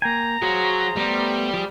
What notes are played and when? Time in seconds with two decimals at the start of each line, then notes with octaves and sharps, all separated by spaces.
0.02 A#3 G5 G#5 A#5
0.42 F#3 G#4 C5 F5
0.97 G3 A3 B3 C5
1.54 F3 G#4